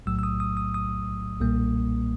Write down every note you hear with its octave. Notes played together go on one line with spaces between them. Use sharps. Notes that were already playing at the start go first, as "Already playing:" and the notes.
B1 A2 F#3 A3 E6
E6
D#6
D#6
D#6
D#6
B1 A#2 G3 A#3